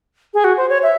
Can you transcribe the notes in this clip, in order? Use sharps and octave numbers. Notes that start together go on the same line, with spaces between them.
G#4
F#4
C5
C#5
E5